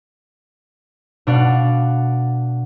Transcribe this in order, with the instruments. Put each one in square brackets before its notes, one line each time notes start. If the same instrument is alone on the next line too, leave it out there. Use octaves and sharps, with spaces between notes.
[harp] B2 D4 F5 F#5